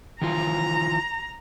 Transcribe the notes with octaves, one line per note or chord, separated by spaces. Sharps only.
D#3 E3 F4 A#5